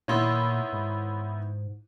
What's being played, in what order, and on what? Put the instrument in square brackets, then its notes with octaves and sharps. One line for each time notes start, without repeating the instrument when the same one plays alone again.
[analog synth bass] A#2 [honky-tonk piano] D#3 B3 E4 [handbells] C#5 C6 E6
[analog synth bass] G#2